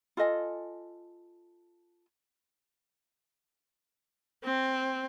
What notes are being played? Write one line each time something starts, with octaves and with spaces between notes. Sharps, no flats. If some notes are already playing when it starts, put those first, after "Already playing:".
F4 A4 D#5 G#5
C4